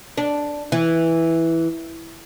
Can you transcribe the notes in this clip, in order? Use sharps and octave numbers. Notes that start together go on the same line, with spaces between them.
D4
E3